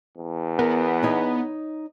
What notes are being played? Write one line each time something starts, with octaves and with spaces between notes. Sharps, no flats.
E2
B3 A#4
D#4 C#5 D#5